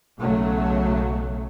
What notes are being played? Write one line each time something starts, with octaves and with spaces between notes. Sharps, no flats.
B1 C#3 F#3 A3